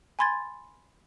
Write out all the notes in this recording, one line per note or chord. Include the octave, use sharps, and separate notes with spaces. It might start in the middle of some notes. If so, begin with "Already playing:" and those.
G#5 B5 C6 G#6 A6